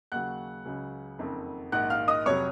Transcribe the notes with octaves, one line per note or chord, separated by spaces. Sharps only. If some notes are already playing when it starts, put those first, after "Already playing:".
D#2 C#3 F#3 F#5 F#6
C#2 C#3 F#3
F#1 F2 D#3
A#1 G#2 D#3 F#5 F#6
F5 F6
D#5 D#6
F1 F2 C3 F#3 C#5 C#6